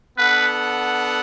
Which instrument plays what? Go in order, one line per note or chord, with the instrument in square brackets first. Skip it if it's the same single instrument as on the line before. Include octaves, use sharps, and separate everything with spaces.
[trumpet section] B3 D4 A4 F#5 [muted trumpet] B4